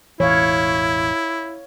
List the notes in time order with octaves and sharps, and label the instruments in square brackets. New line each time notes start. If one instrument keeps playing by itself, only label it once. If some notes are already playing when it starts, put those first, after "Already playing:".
[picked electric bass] E1 A1 E3 [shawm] E4 [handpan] C#5 F5